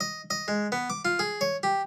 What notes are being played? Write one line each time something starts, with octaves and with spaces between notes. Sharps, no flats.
D#5
D#5
G#3
B3
D6
F4
G#4
C#5
G4